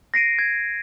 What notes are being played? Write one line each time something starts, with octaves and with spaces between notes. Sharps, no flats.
A#6 C7 D7 D#7
G#6